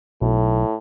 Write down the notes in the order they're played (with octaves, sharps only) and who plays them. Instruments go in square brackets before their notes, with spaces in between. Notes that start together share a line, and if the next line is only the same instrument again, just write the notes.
[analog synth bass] B1 [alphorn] A2